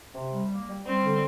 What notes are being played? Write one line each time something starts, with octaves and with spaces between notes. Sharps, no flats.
C3
G3
A#3
G3
G3 C4
D3